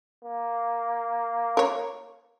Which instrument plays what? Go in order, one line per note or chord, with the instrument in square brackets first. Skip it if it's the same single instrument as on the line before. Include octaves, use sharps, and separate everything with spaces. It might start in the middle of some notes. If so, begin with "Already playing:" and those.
[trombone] A#3
[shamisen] A#4 C#5